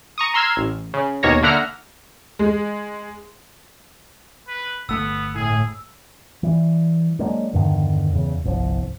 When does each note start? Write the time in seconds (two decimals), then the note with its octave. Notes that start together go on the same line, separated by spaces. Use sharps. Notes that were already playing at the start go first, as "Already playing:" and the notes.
0.18 A#5 C#6 D#6
0.34 A#5 C6 E6 F6 G#6
0.57 A1
0.94 C#3
1.23 D#2 B2 A#3 C#5 A#6
1.43 D3 A#3 E5 F#5 A#5 F6
2.39 G#3
4.48 B4
4.89 G1 A3 B3 E6
5.35 A2 G#4
6.43 E3 G3
7.19 F#3 G#3 A#3 D4
7.53 E2 G2 D3 D#3
8.12 E2 C#3
8.44 G1 C2 A#2 F3